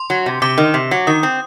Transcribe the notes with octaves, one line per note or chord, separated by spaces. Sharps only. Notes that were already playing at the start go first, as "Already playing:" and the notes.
Already playing: C6
F#3
C3
C3 D6
D#3
C3
F#3
D#3 D#6
C4